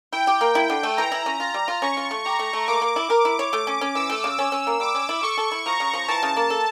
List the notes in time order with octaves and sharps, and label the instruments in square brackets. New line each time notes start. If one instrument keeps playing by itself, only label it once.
[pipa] E4 [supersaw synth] G5
[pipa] G4
A#3
E4
D3
A3
[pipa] E3 [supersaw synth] A#5
[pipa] E4
C#4
[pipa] F4 [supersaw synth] A#5
[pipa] G3
F4
[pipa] C#4 [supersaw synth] C#6
[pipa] F4
A3
[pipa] G4 [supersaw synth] A#5
[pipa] A3
A3
[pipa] A#3 [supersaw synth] D6
[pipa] A#3
E4
A#4
E4
C#5
[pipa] A3 [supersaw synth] D6
[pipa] C#4
C#4
[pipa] E3 [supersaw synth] E6
[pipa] A3
C#3
[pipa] C#4 [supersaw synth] E6
[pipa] C#4
A#3
[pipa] G3 [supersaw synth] D6
[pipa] C#4
E4
[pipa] A4 [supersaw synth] C#6
[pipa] A4
E4
[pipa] F3 [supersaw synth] A#5
[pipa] C#3
F3
[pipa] E3 [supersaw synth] A5
[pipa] C#3
A#3
A4